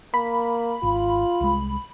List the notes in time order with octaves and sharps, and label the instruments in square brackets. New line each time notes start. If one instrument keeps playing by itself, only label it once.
[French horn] A#3 [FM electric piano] B5
[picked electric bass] G#1 [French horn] F4
[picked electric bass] C2 G#3